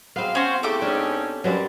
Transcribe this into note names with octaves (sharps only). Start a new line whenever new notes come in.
F#3 G#3 B3 C4 F5
C#4 F#4 C5
A2 C#3 A3 G4 A4 D6
G#2 C#4 D4
F#2 B2 F#3 G3 C4